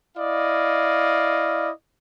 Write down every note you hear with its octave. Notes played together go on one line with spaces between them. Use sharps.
E4 D5 D#5 F5